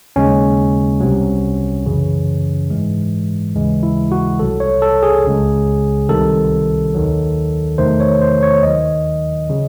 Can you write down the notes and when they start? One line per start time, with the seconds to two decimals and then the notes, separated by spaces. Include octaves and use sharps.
0.16 D#2 C#3 G#3 C#4
1.00 C2 C3 F#3
1.86 F#2 C#3 E3
2.71 G#2 E3 G#3
3.54 D#2 C#3 E3 G#3
3.83 E4
4.12 F#4
4.39 C2 C3 F#3 A4
4.60 C#5
4.82 A4
5.03 G#4
5.25 C#2 C#3 G#3
6.09 C2 C3 D#3 A4
6.95 D#2 D#3 F#3
7.78 E2 C3 D#3 F#3 A3 C5
8.00 C#5
8.22 C5
8.43 C#5
8.63 D#2 D#3 F#3 D#5
9.50 C#3 F#3